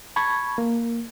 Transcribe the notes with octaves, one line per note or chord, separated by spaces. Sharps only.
A5 B5 C#6 G#6
A#3